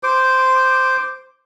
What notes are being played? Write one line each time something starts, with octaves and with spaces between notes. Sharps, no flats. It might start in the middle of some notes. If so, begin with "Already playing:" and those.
C5 D6